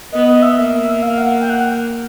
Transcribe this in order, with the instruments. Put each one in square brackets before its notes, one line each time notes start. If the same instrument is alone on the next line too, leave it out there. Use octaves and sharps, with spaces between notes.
[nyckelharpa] B3 [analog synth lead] D#5
[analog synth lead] D#5
E5
[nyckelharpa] A#3 [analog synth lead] E5
[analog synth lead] F5
F#5
G5
F#5